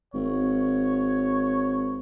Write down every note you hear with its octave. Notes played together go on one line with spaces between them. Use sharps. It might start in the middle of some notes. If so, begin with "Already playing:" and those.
G#1 C#5